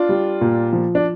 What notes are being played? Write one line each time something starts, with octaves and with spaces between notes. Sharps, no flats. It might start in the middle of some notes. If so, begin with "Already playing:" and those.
Already playing: D4 F4
G3
A#2
F3
D4